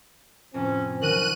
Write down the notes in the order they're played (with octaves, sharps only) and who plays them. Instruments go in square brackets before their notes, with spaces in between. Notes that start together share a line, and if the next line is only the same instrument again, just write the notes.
[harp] F2 A2 C3 [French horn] C4 [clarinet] C#4
[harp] C2 D#3 F#3 [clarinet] A#4 [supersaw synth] F#6 D#7